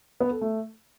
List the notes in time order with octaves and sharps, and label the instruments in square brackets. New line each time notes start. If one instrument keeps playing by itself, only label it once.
[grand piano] B3
A4
A3